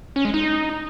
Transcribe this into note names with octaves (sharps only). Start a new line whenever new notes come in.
C#4
G#3
D#4